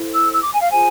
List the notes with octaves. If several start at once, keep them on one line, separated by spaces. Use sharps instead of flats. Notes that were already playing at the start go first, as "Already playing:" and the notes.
Already playing: E4 A4 C5
E6
E6
D6
G#5
F5
F4 G#4 C5 G#5